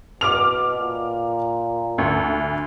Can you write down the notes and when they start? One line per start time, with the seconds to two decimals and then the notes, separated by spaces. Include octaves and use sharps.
0.21 B2 D6 F6 F7
0.79 A#2
1.98 D2